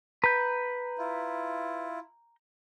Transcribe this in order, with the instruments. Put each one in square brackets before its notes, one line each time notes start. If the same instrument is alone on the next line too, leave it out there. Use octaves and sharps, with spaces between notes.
[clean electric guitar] B4 [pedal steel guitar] A#5 G6
[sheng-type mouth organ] E4 F4